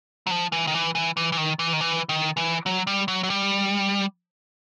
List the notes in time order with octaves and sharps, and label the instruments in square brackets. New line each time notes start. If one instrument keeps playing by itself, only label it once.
[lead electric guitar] F#3
F3
E3
D#3
E3
E3
E3
E3
D#3
E3
D#3
E3
D#3
E3
F#3
G3
F#3
F#3
G3